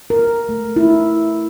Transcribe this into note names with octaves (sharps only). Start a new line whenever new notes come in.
A#4
A3
E4